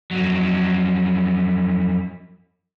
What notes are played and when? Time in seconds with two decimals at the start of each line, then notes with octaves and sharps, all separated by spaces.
0.11 F2 F#3